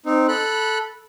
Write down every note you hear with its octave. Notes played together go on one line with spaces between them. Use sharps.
C4 D#4
A4 B5 F#6